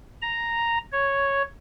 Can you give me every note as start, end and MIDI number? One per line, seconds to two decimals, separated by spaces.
0.22 0.78 82
0.92 1.42 73